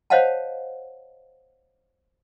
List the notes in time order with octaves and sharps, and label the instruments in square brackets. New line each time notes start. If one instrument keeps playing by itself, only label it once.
[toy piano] C5 C#5 D#5 F5 F#5 A5